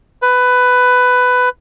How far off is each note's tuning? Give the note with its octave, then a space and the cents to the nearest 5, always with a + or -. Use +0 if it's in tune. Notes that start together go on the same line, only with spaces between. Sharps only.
B4 +15